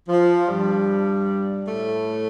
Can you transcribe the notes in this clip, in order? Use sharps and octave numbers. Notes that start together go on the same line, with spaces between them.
F3
G2 G3
A2 A3